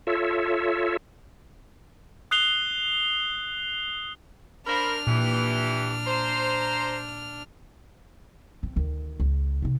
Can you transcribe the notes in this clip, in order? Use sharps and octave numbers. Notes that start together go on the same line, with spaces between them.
F4 A4 C#5 E5
D#6 F#6 C7 F7 G7
D4 A#4 C5 B5 F6
A#2 E3 G4
C5 A#5
C4
D2 D#3
C#2
G#2 C3